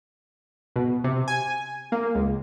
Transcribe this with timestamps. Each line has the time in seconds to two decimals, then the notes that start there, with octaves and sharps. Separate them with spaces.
0.76 B2
1.04 C3
1.28 G#5
1.92 A#3
2.15 C#2